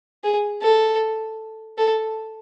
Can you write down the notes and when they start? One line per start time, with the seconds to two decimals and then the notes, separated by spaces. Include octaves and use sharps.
0.24 G#4
0.62 A4
1.78 A4